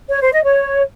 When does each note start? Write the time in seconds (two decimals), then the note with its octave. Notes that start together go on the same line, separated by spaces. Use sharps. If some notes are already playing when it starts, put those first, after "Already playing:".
0.09 C#5
0.21 C5
0.32 D#5
0.44 C#5